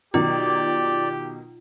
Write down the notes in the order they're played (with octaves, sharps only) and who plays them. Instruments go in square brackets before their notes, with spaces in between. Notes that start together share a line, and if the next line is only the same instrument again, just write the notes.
[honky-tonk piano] B2 D#3 F#3 [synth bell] F4 [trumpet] G4 [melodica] D5